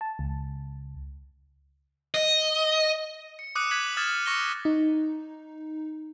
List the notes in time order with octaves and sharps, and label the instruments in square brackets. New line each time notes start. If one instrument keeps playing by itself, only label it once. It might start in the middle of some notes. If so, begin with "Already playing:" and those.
[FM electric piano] A5
C#2
[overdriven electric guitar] D#5
[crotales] C#7
D6 D#6 F#6 C#7 D#7
F#6 G#6 B6 D#7 F#7
D#6 F6 G#6 A6 E7
C#6 A#6 C#7 G7
[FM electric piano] D#4